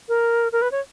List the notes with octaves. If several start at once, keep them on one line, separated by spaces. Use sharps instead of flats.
A#4
A#4
B4
C#5